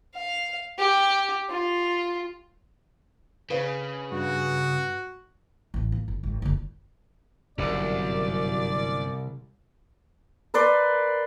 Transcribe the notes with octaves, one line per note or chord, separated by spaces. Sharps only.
F5
G4
F4
C#3 B4 F5
G2 F#4
A1 A3
A#3
G1
G#1
F#1 D3
G1 C2 F#2 A#2 D5
A#4 B4 D5 C6